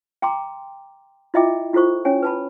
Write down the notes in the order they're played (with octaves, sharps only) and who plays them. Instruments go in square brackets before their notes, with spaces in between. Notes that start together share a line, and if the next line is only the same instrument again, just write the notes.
[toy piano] G5 A#5 C6 D6
E4 F4 D#5 E5 G5 D6
E4 F4 A4 C5 C#6
C#4 C#5 G#5
B4 A5 B5